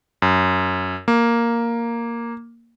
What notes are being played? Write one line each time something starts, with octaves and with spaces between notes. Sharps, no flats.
F#2
A#3